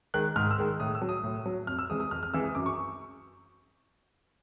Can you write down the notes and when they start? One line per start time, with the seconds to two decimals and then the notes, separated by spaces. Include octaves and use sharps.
0.14 D#3 G#3 F#6
0.36 G#2 F6
0.51 E6
0.58 D#3 G#3
0.80 A2 D#6
0.95 E6
1.02 F#3
1.09 D#6
1.24 A2
1.46 F#3
1.67 F2 F6
1.79 E6
1.90 C3 E3 G#3 D#6
2.00 D#6
2.11 F2 F6
2.23 F6
2.33 C3 E3 G#3 E6
2.44 D#6
2.55 F#2 D6
2.66 C#6